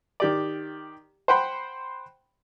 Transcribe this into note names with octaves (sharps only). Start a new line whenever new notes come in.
D#3 G4 D5
C5 F#5 G5 B5 C6